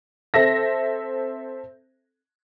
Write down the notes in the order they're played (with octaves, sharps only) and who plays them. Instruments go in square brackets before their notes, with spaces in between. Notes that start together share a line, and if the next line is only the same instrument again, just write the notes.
[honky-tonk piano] C4 A4 E5 A#6